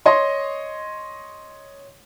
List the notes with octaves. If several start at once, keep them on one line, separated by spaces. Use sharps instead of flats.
C#5 D#5 C6